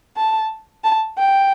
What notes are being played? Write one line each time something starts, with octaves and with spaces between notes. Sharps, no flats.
A5
A5
G5